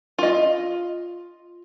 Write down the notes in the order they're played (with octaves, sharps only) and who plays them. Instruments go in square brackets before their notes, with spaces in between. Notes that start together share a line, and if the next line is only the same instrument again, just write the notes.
[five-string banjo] F4 D#5